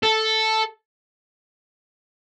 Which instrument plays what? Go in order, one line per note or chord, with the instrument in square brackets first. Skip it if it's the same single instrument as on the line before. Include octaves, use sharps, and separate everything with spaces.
[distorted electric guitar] A4